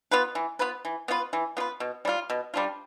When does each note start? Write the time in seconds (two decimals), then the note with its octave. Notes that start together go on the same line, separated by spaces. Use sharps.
0.11 B3 F4 B4
0.35 E3
0.59 B3 F4 B4
0.85 E3
1.08 B3 F4 B4
1.33 E3
1.57 B3 F4 B4
1.80 B2
2.05 G3 D4 F4
2.30 B2
2.54 G3 D4 F4